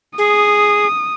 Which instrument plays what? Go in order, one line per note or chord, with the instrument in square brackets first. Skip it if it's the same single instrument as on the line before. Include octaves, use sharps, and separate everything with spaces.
[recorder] G#4 [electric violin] D#6